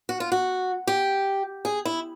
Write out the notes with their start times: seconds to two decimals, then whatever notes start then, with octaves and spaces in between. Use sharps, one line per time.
0.09 F#4
0.20 F4
0.32 F#4
0.87 G4
1.65 G#4
1.85 E4